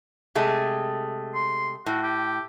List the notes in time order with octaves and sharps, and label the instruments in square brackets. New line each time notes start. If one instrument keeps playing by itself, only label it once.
[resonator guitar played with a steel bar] C3 G#3 A3
[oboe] C6
[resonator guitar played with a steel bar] A2 [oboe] F#4
[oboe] G4